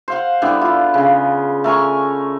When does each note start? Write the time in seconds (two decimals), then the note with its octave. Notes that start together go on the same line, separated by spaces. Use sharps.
0.08 C5 F5 F#5
0.42 D3 G3 B3 E4
0.61 F4
0.94 C#3
1.64 A3 A#4 G#5 C#6